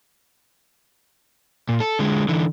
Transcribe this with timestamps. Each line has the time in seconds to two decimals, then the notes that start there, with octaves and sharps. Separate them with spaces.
1.69 A#2
1.80 A4
1.99 D3 G#3
2.29 D3 E3